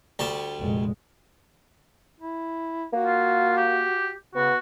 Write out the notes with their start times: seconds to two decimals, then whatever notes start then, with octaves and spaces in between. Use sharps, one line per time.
0.19 D2 G3 A5
0.59 F1 A#2 G#3
2.20 E4
2.93 A#3 F#4
3.05 F4
3.57 G4
4.35 C#3 B3 F#4